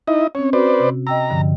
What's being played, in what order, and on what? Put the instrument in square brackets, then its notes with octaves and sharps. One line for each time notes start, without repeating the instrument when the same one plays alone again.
[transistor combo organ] D#4 E4 D#5
[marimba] C4 C#4 [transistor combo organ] C#5
[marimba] F#4 [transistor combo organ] B4 C5 D5
[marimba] C3
[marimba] D#5 G5 E6 [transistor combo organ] A#5
[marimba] G2 D3 F3